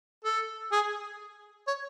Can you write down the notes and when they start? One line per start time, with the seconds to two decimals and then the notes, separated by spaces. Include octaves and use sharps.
0.25 A4
0.72 G#4
1.68 C#5